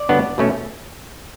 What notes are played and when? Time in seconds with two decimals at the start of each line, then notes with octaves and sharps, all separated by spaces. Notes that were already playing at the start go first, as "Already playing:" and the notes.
Already playing: D5
0.09 G2 D3 F#3 B3 D4
0.38 B2 A3 C#4